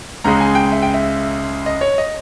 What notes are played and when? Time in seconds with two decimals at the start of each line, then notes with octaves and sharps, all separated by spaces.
0.24 C#2 C#3 G#3 A#5
0.40 G#5
0.55 G5
0.72 E5
0.82 G5
0.94 E5
1.66 D#5
1.81 C#5
1.98 D#5